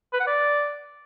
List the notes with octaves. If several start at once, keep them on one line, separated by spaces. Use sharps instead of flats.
B4
F#5
D5